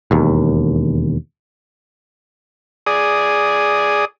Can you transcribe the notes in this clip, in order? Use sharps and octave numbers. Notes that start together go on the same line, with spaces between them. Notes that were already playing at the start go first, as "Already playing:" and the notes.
E1 D#2
G#4 D5 D#6